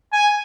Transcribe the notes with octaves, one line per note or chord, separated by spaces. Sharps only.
G#5